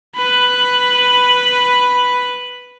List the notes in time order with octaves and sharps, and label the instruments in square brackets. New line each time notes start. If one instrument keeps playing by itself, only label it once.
[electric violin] B4 B5